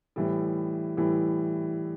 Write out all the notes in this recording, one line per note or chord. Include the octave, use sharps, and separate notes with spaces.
A2 E3 G3
A2 E3 G3